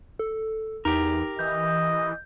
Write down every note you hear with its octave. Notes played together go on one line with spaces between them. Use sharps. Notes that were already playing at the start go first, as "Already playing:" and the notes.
A4
E2 D#4 G4 A#4
E3 D#5 G6